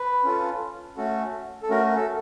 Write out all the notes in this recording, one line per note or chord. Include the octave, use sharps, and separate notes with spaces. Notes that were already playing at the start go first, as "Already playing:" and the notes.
Already playing: B4
C#4 F4 A4
A3 C#4 F#4 A4
A4
A3 C#4 F#4 A#4
A4